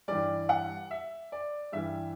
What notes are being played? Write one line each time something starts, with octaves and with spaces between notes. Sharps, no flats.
G2 E3 G3 D5
F#5
E5
D5
G2 E3 G3 E5